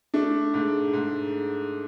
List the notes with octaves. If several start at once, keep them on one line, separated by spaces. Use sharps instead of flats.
A3 D4
G#2
G#2